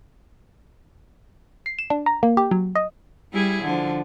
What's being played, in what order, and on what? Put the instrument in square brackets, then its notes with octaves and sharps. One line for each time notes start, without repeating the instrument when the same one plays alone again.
[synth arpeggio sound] C7
E7
D4
A#5
A#3
G4
F#3
D#5
[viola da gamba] G3 E4 G#4
D3 F3